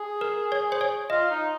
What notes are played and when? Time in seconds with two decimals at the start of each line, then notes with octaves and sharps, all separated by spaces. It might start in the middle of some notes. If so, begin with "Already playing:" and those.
Already playing: G#4
0.21 A#4
0.52 C#5
0.72 C5
0.81 C#5
1.10 F4 D#5
1.30 D#4